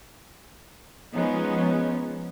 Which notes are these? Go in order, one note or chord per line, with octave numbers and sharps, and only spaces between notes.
F3 G#3 B3 C#4 D#4